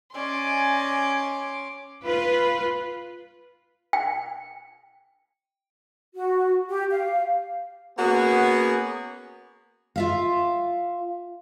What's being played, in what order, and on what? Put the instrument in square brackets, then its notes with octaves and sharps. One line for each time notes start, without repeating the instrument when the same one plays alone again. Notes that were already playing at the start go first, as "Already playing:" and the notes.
[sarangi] C#4 [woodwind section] D5 D#5 G#5 [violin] C6 D6
[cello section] F4 B4
[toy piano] G5
[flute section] F#4
G4
F5
[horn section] A#3 B3 C#4 F#4 G#4
[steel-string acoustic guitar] F4 E5 F5